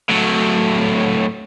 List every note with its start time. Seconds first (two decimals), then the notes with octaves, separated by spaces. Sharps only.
0.09 A2 F#3